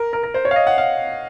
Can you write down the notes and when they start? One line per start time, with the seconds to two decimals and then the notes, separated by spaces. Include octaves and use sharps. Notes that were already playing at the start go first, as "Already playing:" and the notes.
Already playing: A#4
0.13 A#4
0.23 A#4
0.34 C5
0.45 C#5
0.51 F5
0.56 D#5
0.67 F#5
0.78 F5